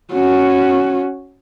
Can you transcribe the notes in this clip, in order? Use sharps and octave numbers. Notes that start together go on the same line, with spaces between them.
C#4 F#4